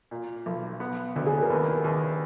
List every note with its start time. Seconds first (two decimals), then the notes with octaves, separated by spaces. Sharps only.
0.11 A#2
0.46 B1
0.80 B3
1.16 D2
1.26 G#4
1.33 A4
1.42 A#4
1.50 D#2 B4
1.84 D#2